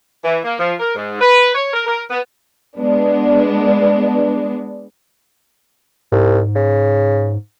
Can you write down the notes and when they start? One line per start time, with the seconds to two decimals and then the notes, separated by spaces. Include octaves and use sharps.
0.24 E3
0.44 A#3
0.59 F3
0.80 A#4
0.95 G#2
1.21 B4
1.55 C#5
1.73 A#4
1.87 A#4
2.11 B3
2.77 G#3 B3 D4
6.12 C2 G#2
6.55 C#3